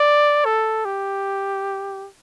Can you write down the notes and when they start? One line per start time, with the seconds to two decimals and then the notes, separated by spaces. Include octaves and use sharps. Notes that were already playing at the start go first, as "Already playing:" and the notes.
Already playing: D5
0.45 A4
0.85 G4